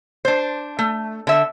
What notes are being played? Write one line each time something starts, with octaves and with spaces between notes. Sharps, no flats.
D4 C5
A3
D3 E5